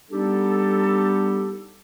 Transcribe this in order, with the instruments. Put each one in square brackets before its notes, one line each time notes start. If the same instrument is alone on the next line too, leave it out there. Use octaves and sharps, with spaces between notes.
[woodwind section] G3 B3 D4 D#4 G4 A4